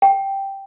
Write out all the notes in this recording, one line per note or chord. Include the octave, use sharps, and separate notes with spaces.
G5